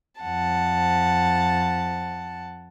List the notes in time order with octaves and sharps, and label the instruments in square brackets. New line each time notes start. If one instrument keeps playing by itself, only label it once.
[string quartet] F2 F#5 A5